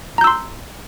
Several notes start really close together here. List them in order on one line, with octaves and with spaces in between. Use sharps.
A#5 G6 E6 C6